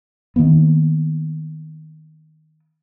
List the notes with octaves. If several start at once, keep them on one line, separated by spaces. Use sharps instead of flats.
D#3 E3 A#3 B3